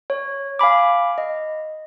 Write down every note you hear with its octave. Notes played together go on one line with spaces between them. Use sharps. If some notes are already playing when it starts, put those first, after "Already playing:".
C#5
F5 G#5 B5 D6
D#5